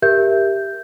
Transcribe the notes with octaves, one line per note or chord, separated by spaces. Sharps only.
G4 A#4 E5 G6